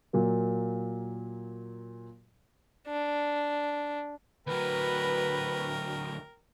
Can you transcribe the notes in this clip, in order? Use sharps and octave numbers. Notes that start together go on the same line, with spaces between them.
A#2 F#3 A#3
D4
D2 F#3 A#4 B4 G5